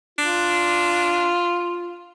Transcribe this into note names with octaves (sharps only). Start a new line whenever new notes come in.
D4 F4